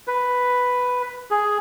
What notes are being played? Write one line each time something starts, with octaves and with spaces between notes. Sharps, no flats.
B4
G#4